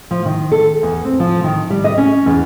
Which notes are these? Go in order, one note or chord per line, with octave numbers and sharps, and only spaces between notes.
F3
D#3
A4
E2
C4
F3
D#3
G3
D#5
C#4
E2